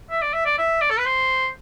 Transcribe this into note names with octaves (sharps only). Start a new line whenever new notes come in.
E5
D5
E5
D5
E5
D5
A4
B4
C5